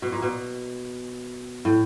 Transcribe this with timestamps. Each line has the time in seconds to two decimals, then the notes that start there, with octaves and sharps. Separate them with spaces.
0.02 B2
0.12 A#2
0.22 B2
1.65 A2